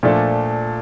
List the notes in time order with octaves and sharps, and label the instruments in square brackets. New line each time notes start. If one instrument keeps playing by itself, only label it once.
[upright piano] A#2 F3 A3 D4 A4